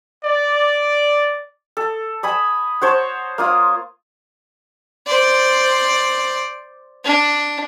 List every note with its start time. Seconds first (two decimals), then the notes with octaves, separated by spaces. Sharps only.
0.25 D5
1.77 A4
2.23 E5 G#5 B5 D#6
2.81 F#4 C5 C#5 A5
3.38 A#3 F4 D#6
5.07 C5 D5
7.05 D4